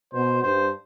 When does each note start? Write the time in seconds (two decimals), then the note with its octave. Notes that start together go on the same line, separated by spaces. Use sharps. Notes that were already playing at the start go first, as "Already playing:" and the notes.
0.13 B2 C5
0.43 G2 C5